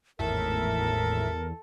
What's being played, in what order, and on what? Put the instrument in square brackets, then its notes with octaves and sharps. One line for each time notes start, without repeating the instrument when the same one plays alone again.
[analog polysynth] G#1 A2 E5 [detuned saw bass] E2 [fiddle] A4 [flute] A#4